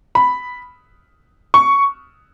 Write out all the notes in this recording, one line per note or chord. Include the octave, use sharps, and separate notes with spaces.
B5
C#6